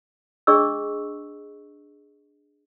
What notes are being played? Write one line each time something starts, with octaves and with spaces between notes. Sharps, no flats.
D4 G#4 D#5 C#6 E6